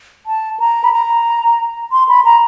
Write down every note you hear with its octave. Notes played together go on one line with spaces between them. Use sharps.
A5
A#5
B5
A#5
C6
B5
A#5